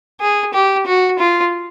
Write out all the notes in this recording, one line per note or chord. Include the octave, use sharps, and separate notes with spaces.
G#4
G4
F#4
F4